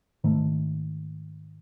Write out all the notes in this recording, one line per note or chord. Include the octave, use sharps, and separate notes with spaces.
G#2 D#3 A3